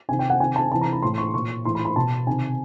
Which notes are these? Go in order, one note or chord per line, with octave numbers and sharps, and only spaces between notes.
C3 D#3 G#5
G5
F#5
C3 D#3 G#5
A5
C3 E3 A5
A#5
B5
A2 E3 C6
C#6
A#2 C#6
A2 E3 C6
B5
B5
B2 A5
C3 D#3 G#5